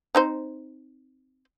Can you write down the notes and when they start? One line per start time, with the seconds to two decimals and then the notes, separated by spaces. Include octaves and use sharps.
0.15 C4 D#4 C5